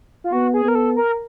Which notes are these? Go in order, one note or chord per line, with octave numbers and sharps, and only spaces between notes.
F4
B3 F#4
G#4
B3 A#4
A4
A#4